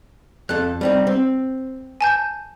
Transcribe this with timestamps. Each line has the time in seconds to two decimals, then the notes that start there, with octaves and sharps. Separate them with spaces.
0.49 F2 A4 F#6
0.81 G3 C4 D#4
1.07 C4
2.01 G#5 A5 G6